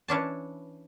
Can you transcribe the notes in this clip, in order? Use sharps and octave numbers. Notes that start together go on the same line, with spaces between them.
E3 C#4 D4 A5